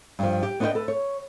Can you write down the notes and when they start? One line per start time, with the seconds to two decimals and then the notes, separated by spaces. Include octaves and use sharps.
0.19 G2 F3
0.43 G4
0.60 B3 D4 G4 C5 D#5 G5
0.75 A4 B4
0.88 C#5